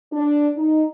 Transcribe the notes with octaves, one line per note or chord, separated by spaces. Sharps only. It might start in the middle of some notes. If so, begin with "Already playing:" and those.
D4
D#4